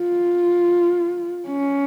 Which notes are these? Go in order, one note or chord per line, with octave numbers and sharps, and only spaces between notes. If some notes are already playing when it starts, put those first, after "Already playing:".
Already playing: F4
C#4